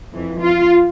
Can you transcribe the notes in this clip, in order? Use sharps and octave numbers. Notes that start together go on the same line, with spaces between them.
F2 E3
F4